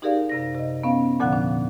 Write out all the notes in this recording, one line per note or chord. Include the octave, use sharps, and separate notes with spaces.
D#4 G4 G#4 A#4 D5 F5
F#2 C3 A#6
C3 D#5
B3 C#4 F5
E2 A#2 D3 F3 F#5 F#6
D4